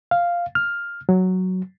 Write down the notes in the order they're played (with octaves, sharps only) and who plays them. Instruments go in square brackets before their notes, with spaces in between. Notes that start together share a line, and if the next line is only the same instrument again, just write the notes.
[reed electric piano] F5
F6
F#3